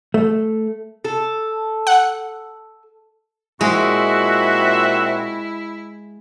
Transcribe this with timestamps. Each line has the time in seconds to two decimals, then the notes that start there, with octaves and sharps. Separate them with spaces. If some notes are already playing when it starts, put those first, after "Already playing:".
0.14 A3
1.05 A4
1.87 F#5
3.61 A#2 G#3 C4 E4 F#4 E5